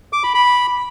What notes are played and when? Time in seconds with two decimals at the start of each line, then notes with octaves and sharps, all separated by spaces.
0.13 D6
0.24 B5
0.34 B5